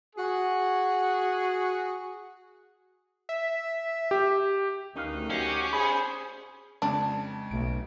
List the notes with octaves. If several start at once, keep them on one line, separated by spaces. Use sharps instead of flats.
F#4 G#4
E5
G4
D2 D#3 C#4 D#4 B4 F5
C#4 F#4 G4 C5 D#5 F5
G#4 C5 D5 B5
F2 C#3 G#3 D4
B1 A3 D7